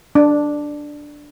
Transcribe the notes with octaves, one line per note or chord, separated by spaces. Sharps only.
D4